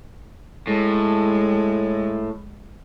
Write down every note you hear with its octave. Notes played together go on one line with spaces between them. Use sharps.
A2 G#3